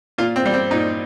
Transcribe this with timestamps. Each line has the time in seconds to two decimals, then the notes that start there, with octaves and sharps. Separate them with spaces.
0.18 A#2 F4
0.36 C4
0.45 G3
0.54 C4
0.71 A#2 D#4